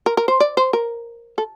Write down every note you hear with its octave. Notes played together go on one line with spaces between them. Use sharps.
A#4
A#4
C5
D5
C5
A#4
A4